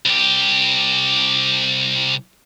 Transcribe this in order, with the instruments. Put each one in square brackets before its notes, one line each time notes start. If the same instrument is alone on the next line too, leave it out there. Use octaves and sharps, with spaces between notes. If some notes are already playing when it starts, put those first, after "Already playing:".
[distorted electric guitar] C2 G4